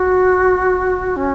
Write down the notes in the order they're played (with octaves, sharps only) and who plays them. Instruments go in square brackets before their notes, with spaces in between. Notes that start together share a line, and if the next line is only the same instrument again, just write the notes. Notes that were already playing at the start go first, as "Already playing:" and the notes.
Already playing: [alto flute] F#4
C#4